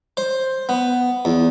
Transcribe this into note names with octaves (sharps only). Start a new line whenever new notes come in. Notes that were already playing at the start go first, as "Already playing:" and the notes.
C5
B3
E2